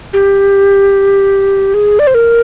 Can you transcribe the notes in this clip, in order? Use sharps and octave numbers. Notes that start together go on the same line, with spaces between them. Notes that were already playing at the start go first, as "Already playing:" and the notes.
G4
G#4
D5
C5
A#4